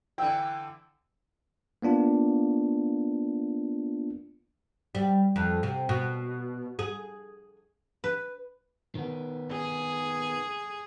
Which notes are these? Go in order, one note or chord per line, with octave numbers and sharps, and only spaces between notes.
D3 E3 E4 G5 E6
A#3 B3 D4 F4
G3
F2
C3
B2
G#4
B4
D#3 B3
G#4